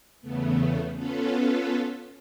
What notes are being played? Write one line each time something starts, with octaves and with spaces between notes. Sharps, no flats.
E2 C#3 A3 B3
B3 C#4 F4 A4 B4